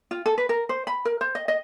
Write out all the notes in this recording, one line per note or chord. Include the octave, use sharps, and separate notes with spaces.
F4
A4
B4
A#4
C5
B5
A#4
C5
D#5
D#5